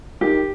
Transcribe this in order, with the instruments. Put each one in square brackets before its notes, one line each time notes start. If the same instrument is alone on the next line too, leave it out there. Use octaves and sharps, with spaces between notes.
[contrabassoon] D#3 [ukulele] G4